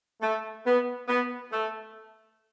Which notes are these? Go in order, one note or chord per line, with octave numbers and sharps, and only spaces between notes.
A3
B3
B3
A3